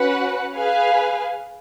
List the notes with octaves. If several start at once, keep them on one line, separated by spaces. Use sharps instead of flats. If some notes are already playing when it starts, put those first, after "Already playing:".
Already playing: C#4 F#4 B4 F#5
G#4 B4 F5 G#5